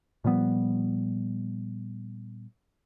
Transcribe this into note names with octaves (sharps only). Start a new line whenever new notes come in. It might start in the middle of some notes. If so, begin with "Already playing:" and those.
A#2 F3 G3 B3